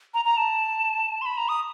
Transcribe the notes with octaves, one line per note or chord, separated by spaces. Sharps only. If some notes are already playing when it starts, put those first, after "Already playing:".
A#5
A#5
A5
C6
B5
A#5
D#6